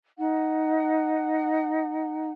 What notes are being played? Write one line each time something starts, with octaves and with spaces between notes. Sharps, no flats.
D#4 F#5